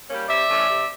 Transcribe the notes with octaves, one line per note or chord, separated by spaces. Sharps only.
G3 A#3 C#4
C3 D5 E5
E3 A3 C#4
C3